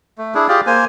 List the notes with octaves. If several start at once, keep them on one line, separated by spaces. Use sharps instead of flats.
A3
D4 E4 G#4
F4 G4 G#4 D5
A#3 C5 G#5